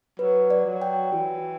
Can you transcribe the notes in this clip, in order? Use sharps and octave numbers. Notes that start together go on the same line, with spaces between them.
F#3 B4
D5
F#3
G5
E3 F#4